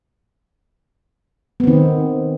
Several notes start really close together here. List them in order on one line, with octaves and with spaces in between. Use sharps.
B3 C4 D#3